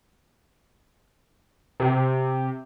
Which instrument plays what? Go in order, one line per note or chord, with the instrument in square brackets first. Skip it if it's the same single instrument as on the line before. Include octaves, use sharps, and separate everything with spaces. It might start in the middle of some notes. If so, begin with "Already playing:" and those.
[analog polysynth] C3